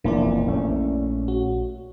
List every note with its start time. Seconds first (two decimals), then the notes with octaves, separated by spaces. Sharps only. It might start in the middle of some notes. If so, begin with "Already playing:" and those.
0.04 E1 F2 A#2 A#3 E4 D5
0.47 A#1 A3 C#4
1.28 F#4